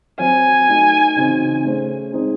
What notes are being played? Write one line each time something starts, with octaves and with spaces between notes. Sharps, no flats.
F#3 C4 F#4 C5 G#5
A3 D#4 F#4
C#3 E3 C4 D#4 F#4
A3 C#4 G#4 C5
G#3 C4 D#4 G#4 C5